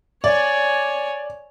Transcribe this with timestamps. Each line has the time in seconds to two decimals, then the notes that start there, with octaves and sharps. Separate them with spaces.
0.24 C#5 D5 G#5